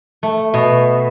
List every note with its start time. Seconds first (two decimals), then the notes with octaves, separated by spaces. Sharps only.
0.23 A3
0.54 B2